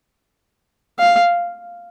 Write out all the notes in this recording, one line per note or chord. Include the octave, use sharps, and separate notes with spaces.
F5